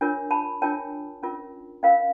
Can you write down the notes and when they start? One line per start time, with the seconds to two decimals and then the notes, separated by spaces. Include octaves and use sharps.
0.01 D4 F4 A#4 C#5
0.31 A5 B5
0.62 D4 F4 A#4 C#5 G5 A5
1.23 C#4 F4 A#4
1.83 C#4 F4 A#4 D#5 F5